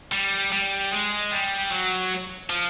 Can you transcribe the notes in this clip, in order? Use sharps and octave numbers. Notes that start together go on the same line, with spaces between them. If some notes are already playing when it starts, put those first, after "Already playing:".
G3
G3
G#3
G3
F#3
F3